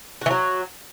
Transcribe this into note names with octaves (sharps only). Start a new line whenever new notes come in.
E3 F#3 F#4